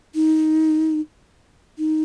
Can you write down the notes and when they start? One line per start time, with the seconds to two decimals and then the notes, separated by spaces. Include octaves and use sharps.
0.15 D#4
1.78 D#4